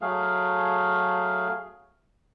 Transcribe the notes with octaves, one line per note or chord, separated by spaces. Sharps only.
F#3 A3 G#4 F5